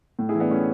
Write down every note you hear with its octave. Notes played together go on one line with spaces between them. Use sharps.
A2
E4 G#4
E3
B3 D4
A2 C#4